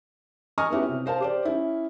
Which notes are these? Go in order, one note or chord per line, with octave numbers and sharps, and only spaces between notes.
D#5 G#5 A#5 C#6 D#6 F6
B3 C#4 E4 F#4 G4
C3
A#4 C5 F5 A5
G4 C5 D5
C#4 E4